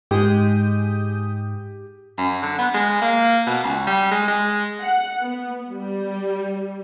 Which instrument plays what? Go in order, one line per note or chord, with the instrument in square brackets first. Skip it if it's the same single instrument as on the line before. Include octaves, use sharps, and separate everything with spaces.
[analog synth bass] G#2 [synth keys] G#3 D#6 G6 [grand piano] G4
[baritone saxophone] F#2
D3
B3
G#3
A#3
B2
C#2
G3
G#3
G#3
[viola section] F#5
B3
G3